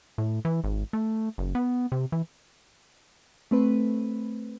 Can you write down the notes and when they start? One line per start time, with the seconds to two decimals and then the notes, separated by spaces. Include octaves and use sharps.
0.18 A2
0.45 E3
0.64 G#1
0.93 A3
1.38 F#1
1.55 B3
1.92 C3
2.12 E3
3.51 A3 C4 B4